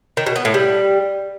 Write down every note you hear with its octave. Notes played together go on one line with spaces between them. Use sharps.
D#3
B2
B3
A2
G3